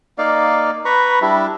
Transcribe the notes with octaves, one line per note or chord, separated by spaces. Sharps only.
A#3 D#4 D5 F5
B4 A#5 B5 C#6
G3 D4 E4